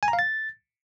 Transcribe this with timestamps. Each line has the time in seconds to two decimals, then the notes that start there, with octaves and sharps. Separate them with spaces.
0.03 G#5
0.08 A#5
0.13 F5
0.19 A6